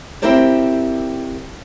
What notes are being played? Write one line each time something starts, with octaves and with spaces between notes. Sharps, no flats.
C4 E4 G4 A#4 C5 D5